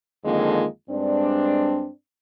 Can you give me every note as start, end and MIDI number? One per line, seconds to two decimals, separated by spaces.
0.24 0.64 41
0.24 0.64 50
0.24 0.64 51
0.24 0.64 56
0.24 0.64 58
0.24 0.64 65
0.89 1.88 43
0.89 1.88 56
0.89 1.88 60
0.89 1.88 62